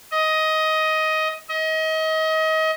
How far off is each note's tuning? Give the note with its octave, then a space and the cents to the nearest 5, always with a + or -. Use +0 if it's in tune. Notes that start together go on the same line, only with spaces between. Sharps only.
D#5 +15
D#5 +30